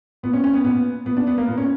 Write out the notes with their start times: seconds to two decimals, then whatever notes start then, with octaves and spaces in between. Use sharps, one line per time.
0.23 A#2 B3
0.33 C#4
0.44 C#4
0.54 B3
0.64 A#2 B3
1.05 A#2 B3
1.17 D4
1.27 B3
1.38 A#3
1.47 A#2 B3
1.58 C#4